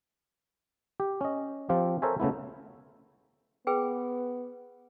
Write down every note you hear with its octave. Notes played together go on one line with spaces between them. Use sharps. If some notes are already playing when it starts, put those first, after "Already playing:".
G4
C#4 D#5
F3 C4 F4 G4
A4 A#4 C5 C#5 E5 G#5
C#3 A3 B3 E4
B3 G#4 B4 G5